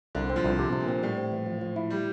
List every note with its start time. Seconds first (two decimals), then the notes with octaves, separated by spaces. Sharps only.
0.15 C2 D3
0.30 C4
0.36 F3
0.44 C2
0.59 C3
0.73 C3
0.80 A#2
0.89 C4
1.03 A2 G3
1.17 C4
1.32 E3
1.46 F3
1.61 F3
1.76 E4
1.90 G3